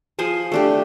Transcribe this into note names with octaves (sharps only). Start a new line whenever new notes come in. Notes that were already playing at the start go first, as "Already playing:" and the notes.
F3 G#4 C5
A3 D4 G4